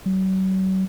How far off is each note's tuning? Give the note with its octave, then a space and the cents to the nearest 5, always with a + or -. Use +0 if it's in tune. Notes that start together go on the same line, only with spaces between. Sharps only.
F#3 +40